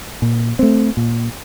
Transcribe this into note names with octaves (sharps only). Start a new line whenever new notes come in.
A#2
A3 C4
A#2